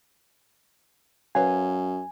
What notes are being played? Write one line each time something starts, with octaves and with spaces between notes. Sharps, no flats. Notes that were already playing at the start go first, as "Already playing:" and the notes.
F#2 B4 C#5 F5 G#5